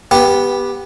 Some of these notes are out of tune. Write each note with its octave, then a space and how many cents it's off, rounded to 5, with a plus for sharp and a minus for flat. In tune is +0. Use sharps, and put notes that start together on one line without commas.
B3 -10 G4 +10